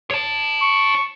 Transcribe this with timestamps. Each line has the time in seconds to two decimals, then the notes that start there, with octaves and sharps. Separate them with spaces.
0.11 C#5 A5
0.63 C#6